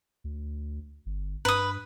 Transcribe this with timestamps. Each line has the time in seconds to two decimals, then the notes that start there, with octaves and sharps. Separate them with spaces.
0.24 D2
1.06 G1
1.45 G2 B4 D#6